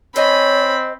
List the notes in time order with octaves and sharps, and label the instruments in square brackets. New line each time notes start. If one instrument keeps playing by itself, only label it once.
[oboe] C4 [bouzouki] C5 D#5 G#5 [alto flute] C#5 [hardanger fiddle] B5